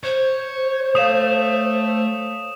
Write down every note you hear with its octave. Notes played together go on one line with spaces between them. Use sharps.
C5 C#5
A3 C#5 F5 D#6 E7